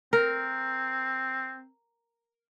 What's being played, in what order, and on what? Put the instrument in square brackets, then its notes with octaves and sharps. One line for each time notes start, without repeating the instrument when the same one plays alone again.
[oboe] C4 [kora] A#4